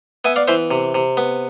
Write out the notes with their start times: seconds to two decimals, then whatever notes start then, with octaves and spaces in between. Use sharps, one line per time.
0.25 B3 E5 G#5
0.36 D5 F5
0.48 E3 C5 E5
0.71 C3
0.95 C3
1.17 B3